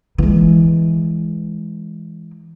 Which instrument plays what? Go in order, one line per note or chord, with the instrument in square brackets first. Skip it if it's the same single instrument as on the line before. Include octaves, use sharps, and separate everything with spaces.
[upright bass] E3 G#3